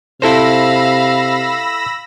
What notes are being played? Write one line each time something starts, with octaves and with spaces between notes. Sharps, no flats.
C3 E4 A4 C5 F5 B5 E6 A#6